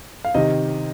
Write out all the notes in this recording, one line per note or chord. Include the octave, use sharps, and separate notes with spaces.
F5
C3 D#3 D#5